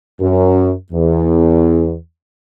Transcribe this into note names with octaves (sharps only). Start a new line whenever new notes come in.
F#2
E2